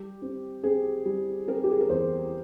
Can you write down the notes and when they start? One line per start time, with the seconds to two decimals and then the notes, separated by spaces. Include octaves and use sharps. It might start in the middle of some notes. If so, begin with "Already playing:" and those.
Already playing: G3 G4
0.22 C4
0.63 C4 G#4
1.05 G3
1.48 C4 A#4
1.64 G4
1.71 G#4
1.80 A#4
1.89 E2 C5